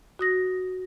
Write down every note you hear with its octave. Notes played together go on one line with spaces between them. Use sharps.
F#4 D#6 A#6